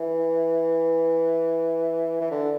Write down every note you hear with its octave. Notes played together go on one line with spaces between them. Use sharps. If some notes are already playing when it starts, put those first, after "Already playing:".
Already playing: E3
E3
D3